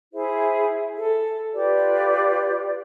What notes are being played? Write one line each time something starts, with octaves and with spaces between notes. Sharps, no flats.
E4 G#4 C5 E5
A4
F4 G4 B4 D5